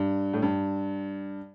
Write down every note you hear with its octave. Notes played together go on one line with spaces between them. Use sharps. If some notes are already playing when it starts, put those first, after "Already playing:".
Already playing: G2
A2
G2